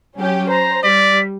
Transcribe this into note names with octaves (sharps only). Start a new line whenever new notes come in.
F#3 C#4 G4
C5 A#5
G3 D5 B6